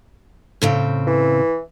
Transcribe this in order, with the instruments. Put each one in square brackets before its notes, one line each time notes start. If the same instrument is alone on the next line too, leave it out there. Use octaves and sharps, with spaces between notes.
[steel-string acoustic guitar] A2 C#3 C4
[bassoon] E3